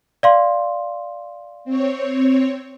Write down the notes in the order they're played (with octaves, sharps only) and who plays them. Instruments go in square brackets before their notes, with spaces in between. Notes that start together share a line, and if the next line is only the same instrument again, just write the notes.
[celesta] D5 F5 C6
[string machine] C4 C#5